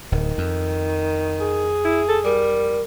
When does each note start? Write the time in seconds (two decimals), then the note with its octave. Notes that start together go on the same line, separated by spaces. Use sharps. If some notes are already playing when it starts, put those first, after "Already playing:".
0.12 D1 D#3
0.38 F2
1.40 G#4
1.84 E4
2.09 A4
2.24 G3 A#4